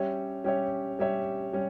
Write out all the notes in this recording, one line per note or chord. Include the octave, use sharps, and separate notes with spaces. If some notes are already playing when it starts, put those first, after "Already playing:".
Already playing: G3 C#4 G4 C#5 E5
G3 C#4 G4 C#5 E5
G3 C#4 G4 C#5 E5
G3 C#4